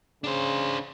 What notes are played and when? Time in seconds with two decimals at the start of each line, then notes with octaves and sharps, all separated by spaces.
0.24 C#3 D4 C5